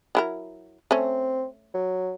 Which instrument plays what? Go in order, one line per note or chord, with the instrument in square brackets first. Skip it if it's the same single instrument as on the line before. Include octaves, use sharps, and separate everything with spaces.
[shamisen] F#3 E4 A#4
[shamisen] A3 C#4 [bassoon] C4
[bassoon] F#3